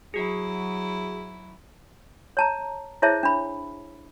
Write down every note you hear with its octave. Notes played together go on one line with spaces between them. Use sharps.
F#3 E4 F#4 G#4
C#5 A5 A#5
E4 G#4 C5 C#5 E5 A5
D4 B5